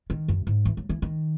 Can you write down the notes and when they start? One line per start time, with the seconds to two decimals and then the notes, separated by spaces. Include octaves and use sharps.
0.10 D#3
0.28 F#2
0.47 G#2
0.65 E3
0.77 F#3
0.89 E3
1.02 D#3